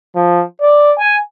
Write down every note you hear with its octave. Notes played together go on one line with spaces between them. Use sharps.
F3
D5
G#5